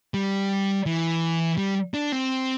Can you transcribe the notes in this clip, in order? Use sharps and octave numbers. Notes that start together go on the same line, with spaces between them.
G3
E3
G3
D4
C4